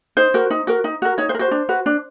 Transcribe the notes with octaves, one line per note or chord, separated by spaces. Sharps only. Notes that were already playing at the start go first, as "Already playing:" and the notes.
D#4 C5
F#4 A#4
D#4
F#4 A#4
D#4
F#4 A#4
D#4 C#5
C5
A#4
F#4 C5
D4
F#4 B4
D4